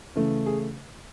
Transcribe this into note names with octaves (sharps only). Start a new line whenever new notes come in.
C#3 E3 A3
G#4